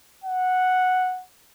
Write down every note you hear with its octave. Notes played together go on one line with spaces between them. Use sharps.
F#5